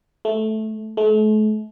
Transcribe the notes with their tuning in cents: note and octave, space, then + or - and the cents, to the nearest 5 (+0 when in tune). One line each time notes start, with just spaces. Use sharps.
A3 -10
A3 -40